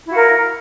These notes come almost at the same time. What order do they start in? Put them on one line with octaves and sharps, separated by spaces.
E4 F#4 F5 A#4